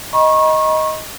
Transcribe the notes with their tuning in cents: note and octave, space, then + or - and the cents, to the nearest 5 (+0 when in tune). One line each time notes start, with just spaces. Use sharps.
D#5 +10 A#5 +45 C#6 -30